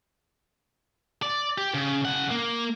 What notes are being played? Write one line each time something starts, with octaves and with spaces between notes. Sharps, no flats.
D5
G4
C#3
C#3 F#5
A#3